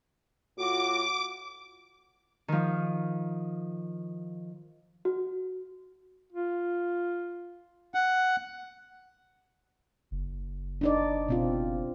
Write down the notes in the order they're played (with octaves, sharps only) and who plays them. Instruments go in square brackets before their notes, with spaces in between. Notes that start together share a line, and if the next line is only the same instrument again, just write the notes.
[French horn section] A2 F4 F#4 [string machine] D6
[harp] D#3 F3
[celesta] F#4
[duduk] F4
[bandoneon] F#5
[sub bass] F#1
[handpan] D4 D#4 D5
B2 C4 F4